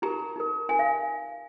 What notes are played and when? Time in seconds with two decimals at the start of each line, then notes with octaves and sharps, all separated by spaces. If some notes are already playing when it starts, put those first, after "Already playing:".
0.02 D#4 G4 A#4 A#5
0.36 D#4 G4 A#4
0.69 D#4 A#4 G#5
0.79 F5